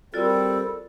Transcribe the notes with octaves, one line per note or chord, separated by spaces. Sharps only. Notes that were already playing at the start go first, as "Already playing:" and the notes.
G3 C4 F4 F#4 A4 A#4 D5 A6